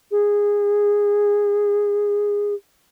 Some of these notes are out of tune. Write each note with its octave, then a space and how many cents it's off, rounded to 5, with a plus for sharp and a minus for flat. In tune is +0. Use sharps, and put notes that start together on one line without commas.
G#4 -15